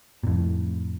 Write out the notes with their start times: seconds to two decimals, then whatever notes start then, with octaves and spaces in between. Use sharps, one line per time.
0.23 A#2
0.27 F2 A2